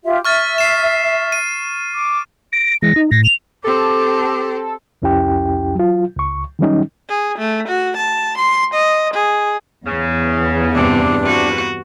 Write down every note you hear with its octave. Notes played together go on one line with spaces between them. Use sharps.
F4 G4 E5
E5 C#6 F6 A6
C7 E7
D#7
D6
A#6 D7
E3 G#3 A#6
D#4
A2 A#6
F7
C4 G4 A4 D6
C2 F2 C#4 E4 G4 G5
F#3 F4
C#2 C#6
D#3 F#3 G3 C#4 D#4
G#4
A3
F#4
A5
C6
D#5
G#4
E2 C#3
G2 C3 D4
A#2 F3 F#4 B4